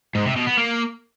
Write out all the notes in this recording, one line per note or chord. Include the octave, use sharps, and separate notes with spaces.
G#2
C3
B2
B3
A#3